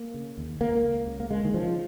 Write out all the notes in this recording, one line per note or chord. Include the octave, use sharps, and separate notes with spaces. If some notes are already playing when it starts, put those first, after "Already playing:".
Already playing: A#3
C#3
D#2
C#2 A#3
C#2
C#3
A#3
C#3 G#3
D#3
C#3 F3